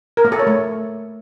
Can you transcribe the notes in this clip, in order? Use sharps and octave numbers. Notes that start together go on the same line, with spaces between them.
A#4
A#3
A4
C#5
A3